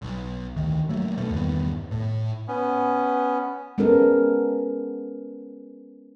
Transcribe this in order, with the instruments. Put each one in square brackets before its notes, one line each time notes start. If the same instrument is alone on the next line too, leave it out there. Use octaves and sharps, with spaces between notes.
[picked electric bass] B1
D2 D#3
F#3 A3 A#3
B2 A3
E2 G2 D#3 B3
A2
[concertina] B3 C#4
[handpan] G#3 B3 C#4 A4 A#4